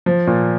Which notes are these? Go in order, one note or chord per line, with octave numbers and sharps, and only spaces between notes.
F3
A#2